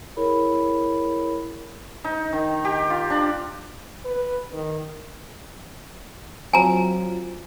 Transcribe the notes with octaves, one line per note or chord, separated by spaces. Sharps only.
E4 G#4 A#4 C#5 B5
D#4
D#3
G4
F4
D4
B4
D#3
F#3 C4 F4 G#5 A#5